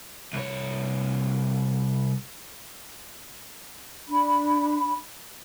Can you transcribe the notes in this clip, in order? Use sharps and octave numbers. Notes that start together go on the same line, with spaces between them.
C2 C#5
D4 B5